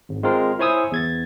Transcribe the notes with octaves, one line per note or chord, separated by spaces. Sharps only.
G#1
G#3 C4 F4 A#4
E4 C5 C#5 G#5 D#6 E6
E2 G#6 A6